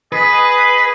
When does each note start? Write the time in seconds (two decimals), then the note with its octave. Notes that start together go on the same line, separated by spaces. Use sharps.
0.12 G#4 B4 D#5